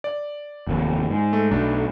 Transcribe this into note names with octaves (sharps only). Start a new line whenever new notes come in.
D5
F1 D#2
G#2
A3
B1 A3 D4